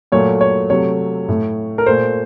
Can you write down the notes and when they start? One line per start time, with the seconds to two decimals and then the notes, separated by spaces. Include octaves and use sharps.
0.12 A#2 F#3 A3 C#5
0.41 C#5
0.70 C3 F#3 A3 C#5
1.28 A2 A3
1.78 A#4
1.86 A#2 A3 C5